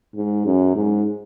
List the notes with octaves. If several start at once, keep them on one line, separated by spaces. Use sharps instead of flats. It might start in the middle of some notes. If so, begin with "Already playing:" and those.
G#2
F#2
G#2